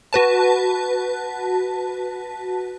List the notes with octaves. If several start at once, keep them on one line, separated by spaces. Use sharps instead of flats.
F#4 B4 A5